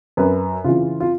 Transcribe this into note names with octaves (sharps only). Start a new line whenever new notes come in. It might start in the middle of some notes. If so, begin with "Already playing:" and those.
F#2 B4
C#3 E3 F4
F4